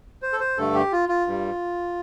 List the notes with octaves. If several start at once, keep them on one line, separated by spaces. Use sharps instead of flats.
C5
A4
C5
G2 D3 A3 A4
G4
F4
F4
G2 G3